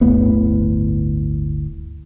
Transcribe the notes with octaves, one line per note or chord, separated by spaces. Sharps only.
D1 G1 A2 B3